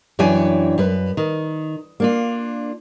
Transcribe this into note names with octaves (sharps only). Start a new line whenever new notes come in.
F#2 E3 D4 C#5 G5 G#5
F#2 B4
D#3
A#3 D4 F4